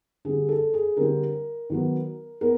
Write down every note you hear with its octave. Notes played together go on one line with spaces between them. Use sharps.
D3 G3 C4 G#4
A4
G#4
D3 G3 C4 A#4
D#3 F#3 B3
B3 A#4